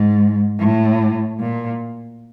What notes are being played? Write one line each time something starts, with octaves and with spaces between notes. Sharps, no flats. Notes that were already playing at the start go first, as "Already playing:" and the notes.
Already playing: G#2
A2
A#2